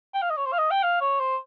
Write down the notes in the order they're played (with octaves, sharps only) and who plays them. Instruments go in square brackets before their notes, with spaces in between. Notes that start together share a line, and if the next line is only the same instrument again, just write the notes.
[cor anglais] G5
F5
D#5
C#5
C5
F5
D#5
G5
F5
C#5
C5